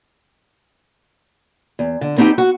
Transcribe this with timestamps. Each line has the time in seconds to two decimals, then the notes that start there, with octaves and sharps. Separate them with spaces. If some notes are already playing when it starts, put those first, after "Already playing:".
1.79 E2
2.01 D3
2.17 B3 C4 D#4 G4
2.38 F#4